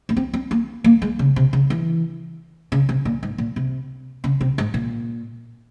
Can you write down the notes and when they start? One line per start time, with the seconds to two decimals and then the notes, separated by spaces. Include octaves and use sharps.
0.09 A#3
0.17 C4
0.34 C4
0.51 A#3
0.84 A#3
1.02 G#3
1.19 C#3
1.36 C3
1.53 C#3
1.70 E3
2.72 C#3
2.89 C3
3.05 A#2
3.23 G#2
3.38 A#2
3.56 C3
4.24 C#3
4.41 C3
4.58 G#2
4.74 A#2